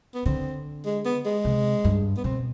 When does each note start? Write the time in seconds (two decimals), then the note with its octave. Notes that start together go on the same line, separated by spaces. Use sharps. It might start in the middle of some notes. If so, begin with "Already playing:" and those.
0.14 B3
0.26 D3 C4
0.85 G#3
1.05 B3
1.25 G#3
1.45 C3
1.85 G2
2.17 B3
2.24 B2 C4